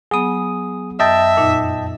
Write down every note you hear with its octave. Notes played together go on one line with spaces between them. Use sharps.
F#3 B3 G#4 D#6
F#2 D#5 E5 G5 A5
F2 A#2 D#4